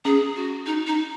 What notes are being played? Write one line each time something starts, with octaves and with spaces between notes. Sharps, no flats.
C#4 G#4
F#4
D#4
D#4